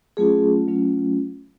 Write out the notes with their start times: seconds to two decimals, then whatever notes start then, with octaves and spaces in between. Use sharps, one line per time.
0.17 F#3 A3 C#4 F4 G#4
0.68 F#3 A3 C#4 F4